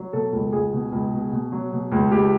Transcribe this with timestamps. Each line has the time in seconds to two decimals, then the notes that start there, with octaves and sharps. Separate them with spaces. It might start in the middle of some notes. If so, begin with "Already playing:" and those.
Already playing: F#3
0.13 B2 A4
0.33 C#2
0.53 C#2 G#4
0.73 B2
0.92 C#2
1.13 B2
1.32 B2
1.52 F#3
1.72 B2
1.92 C#2
2.12 C#2 G4